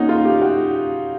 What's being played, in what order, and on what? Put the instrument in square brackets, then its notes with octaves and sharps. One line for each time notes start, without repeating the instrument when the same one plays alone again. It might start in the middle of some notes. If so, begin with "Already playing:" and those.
Already playing: [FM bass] A#3 [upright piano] C#4 D#4 F#4
[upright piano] F4
G4
F#4